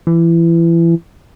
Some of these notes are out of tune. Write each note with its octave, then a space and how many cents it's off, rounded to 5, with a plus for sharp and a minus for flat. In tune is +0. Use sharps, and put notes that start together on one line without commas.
E3 +25